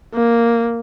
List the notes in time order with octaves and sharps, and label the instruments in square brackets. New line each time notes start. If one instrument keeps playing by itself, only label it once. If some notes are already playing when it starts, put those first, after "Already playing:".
[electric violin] A#3